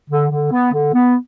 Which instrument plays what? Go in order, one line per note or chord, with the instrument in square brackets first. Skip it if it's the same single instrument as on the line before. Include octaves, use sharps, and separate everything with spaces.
[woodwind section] D3
D3
B3
D3
B3